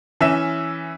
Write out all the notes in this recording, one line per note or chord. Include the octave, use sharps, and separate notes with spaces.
E3 C#4 E5 E7